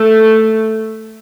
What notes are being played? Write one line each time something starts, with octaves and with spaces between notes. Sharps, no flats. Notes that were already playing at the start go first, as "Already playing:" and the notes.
Already playing: A3